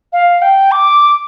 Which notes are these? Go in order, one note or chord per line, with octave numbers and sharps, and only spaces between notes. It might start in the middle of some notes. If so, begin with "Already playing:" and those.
F5
G5
D6